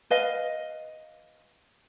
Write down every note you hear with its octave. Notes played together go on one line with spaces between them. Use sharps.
B4 D#5 F5